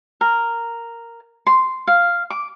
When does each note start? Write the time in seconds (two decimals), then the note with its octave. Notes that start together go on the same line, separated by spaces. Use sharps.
0.21 A#4
1.47 C6
1.87 F5
2.30 D6